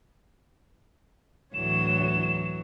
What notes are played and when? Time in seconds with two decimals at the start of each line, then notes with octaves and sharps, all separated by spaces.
1.54 D2 A2 E3 F#3 C#5 E7